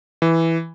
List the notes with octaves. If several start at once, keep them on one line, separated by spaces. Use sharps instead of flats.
E3